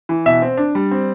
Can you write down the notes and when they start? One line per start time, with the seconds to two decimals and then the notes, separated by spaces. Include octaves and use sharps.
0.09 E3
0.26 B2 E5
0.42 C4
0.57 D4
0.75 G3
0.91 C4